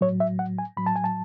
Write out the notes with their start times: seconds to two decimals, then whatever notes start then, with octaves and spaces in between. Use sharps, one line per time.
0.01 A2 F#3 C#5
0.20 E5
0.39 F#5
0.58 G#5
0.77 A2 F#3 B5
0.86 A5
0.96 G#5
1.04 A5